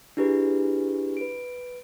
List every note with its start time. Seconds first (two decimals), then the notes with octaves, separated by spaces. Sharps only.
0.17 D4 E4 G4 G#4 B4
1.17 B4 D7